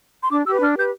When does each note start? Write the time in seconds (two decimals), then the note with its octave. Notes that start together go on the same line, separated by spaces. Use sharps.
0.23 C6
0.31 D4 D6
0.46 G4 E6
0.49 B4
0.61 D4 F6
0.76 G4 B4 G6